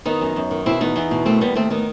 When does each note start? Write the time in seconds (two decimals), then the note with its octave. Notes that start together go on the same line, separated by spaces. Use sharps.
0.05 D#3 B3 D#4
0.21 F#2
0.36 F#2
0.51 D#3
0.66 B2 C4 E4
0.81 E2 B3 D#4
0.96 E2
1.11 B2
1.25 D#3 A3 C4
1.41 D#2 G3 B3
1.55 D#2 A3 C4
1.70 D#3 B3 D#4